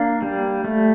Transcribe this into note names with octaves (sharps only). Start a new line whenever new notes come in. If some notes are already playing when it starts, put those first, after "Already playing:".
Already playing: A#3 D4
G3
A3